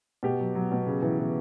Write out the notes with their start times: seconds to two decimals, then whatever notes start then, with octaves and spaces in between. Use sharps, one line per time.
0.23 B2 G4
0.40 F#3
0.55 F#3
0.72 B2
0.87 C#3
1.02 E3
1.20 E3